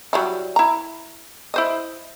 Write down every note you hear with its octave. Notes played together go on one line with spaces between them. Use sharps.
F#3 G3 E4
E4 A#5
E4 C5 D#5